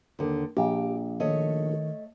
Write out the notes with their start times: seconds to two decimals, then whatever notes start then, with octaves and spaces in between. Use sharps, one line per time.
0.19 D#2 D3
0.57 A#1 G4
1.20 D#3 A3 C#5 D#5